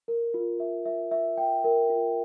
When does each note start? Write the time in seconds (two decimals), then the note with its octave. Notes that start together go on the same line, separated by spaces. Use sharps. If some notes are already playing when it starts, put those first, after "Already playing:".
0.08 A#4
0.34 F4
0.60 E5
0.86 E5
1.11 E5
1.38 G5
1.64 A#4
1.89 F4